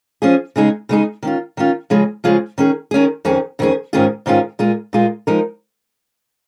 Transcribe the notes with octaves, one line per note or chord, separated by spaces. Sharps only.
F3 C#4 F4 G#4
C#3 G#3 D#4 G#4
C#3 G#3 D#4 G#4
D#3 C#4 F4
D#3 C#4 F4
C#3 F3 G#3 F4 G#4
C#3 F3 G#3 F4 G#4
D#3 C#4 G#4
D#3 C#4 G#4
F2 D#3 C#4 G#4
F2 D#3 C#4 G#4
G#2 D#3 C#4 F4 G#4
G#2 D#3 C#4 F4 G#4
A#2 G#3 F4 G#4
A#2 G#3 F4 G#4
F3 G#3 D#4 A#4